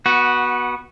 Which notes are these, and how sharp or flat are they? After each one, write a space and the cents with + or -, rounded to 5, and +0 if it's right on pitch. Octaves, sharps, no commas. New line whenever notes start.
B3 -20 F#4 +0